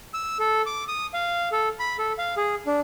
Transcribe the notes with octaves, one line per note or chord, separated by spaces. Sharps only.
E6
A4
D6
D#6
F5
A4
B5
A4
F5
G#4
D4